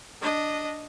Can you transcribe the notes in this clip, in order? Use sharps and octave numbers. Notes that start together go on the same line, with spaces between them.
D4 D#5